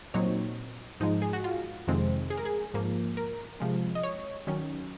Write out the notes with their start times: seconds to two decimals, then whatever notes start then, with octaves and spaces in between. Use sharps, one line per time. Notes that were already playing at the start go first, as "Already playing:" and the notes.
0.14 A#2 F#3 C4 D#4 C#5
1.00 G#2 F3 G#3 D#4
1.22 G#4
1.33 F#4
1.44 F4
1.87 F2 C3 D#3 G#3 C4
2.30 G#4
2.38 A#4
2.45 G#4
2.74 G#2 F3 A#3
3.17 A#4
3.60 C3 F3 G#3
3.95 D#5
4.03 C#5
4.47 D#3 F#3 C#4